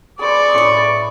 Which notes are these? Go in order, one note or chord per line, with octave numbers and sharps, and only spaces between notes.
G#4 B4 C5 D5 C#6
A2 C#4 E4 B4 D#6